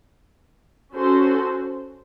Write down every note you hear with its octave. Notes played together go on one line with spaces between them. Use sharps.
C#4 F#4 A4 C5